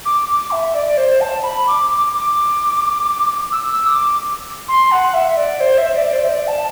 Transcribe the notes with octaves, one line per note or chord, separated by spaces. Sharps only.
D6
D6
E5
D5
C5
A5
B5
D6
D6
D6
E6
D6
C6
F#5
E5
D5
C5
E5
D5
C5
E5
D5
A5